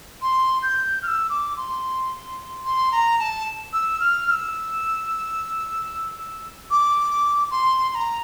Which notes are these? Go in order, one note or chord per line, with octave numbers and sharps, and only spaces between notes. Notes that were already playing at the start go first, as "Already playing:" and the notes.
C6
G6
F6
E6
D6
C6
C6
A#5
A5
E6
F6
F6
E6
D6
C6
C6
A#5